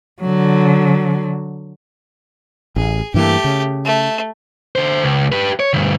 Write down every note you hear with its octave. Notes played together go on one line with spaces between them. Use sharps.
D3 F#3
A1 G#4
G2 E3 A3 A#3 G4
C#3
A3
D3 C5
C#2
G4 B4
C#5
D2 G2